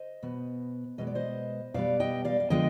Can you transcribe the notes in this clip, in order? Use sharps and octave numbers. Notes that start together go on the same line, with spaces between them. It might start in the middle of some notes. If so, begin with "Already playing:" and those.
Already playing: C5 D#5
B2 B3
B2 G#3 B3 D#5
D5
C5 D#5
B2 G3 B3 D5 F5
D#5 G5
D5 F5
F5
D3 F3 G#3 B3 D#5 G5